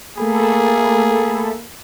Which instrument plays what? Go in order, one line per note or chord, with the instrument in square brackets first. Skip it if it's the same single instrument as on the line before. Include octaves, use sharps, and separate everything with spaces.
[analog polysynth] A3 A4 B5 [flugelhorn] A#3 [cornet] G#4